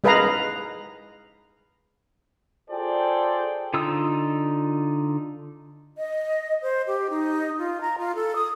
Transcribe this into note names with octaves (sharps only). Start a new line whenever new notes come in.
G#3 G#4 B4 D#5 F5 A#5
F4 G#4 A4 C5 D5 G5
D3 D#4 F4 D#6 E6
D#5
C5
G4
D#4
F4
A#5
F4
A4
D#6